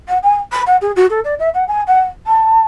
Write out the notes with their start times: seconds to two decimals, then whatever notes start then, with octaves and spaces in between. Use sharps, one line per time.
0.08 F#5
0.23 G#5
0.52 B5
0.66 F#5
0.81 G#4
0.96 F#4
1.10 A4
1.24 D5
1.39 E5
1.54 F#5
1.68 G#5
1.87 F#5
2.27 A5